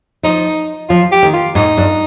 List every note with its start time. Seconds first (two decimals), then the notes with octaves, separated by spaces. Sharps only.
0.23 F3 D#4
0.89 F3 F4
1.12 G4
1.23 D#3
1.33 F4
1.55 G#2 D#4
1.77 G2